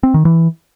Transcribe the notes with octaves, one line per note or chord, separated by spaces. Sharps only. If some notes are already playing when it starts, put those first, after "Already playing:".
C4
D#3
E3